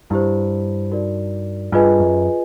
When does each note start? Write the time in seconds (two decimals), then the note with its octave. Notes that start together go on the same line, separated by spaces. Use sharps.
0.10 G2 E4 G4 C5
0.91 D#4 F#4 A#4 D5
1.72 G2 F4 G#4 B4 D#5 G#5
2.00 F#2